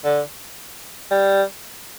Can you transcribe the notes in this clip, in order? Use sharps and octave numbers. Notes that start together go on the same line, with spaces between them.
D3
G3